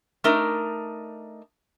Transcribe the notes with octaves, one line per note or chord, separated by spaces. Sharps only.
A3 D4 D#4 A#4